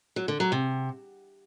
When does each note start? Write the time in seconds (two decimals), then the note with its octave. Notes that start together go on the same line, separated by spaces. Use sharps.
0.16 F#3
0.28 D3
0.40 F#3
0.52 C3